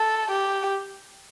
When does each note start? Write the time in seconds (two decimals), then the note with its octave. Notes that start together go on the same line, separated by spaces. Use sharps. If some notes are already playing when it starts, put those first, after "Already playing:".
Already playing: A4
0.31 G4